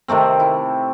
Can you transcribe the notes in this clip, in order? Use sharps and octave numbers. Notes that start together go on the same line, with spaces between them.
C3 D#3 A3 C4
E4